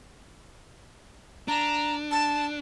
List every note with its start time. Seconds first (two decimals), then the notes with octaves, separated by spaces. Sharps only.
1.48 D4 A#5
2.11 A5